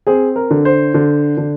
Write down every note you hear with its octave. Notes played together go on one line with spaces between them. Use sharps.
C4 G#4
A#4
D3
C5
D3
D3